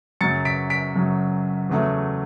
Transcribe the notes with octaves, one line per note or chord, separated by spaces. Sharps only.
F#2 C#3 F#3 A6 C#7
B6 D7
B6 D7
F#2 C#3 F#3
E2 C#3 F#3 A3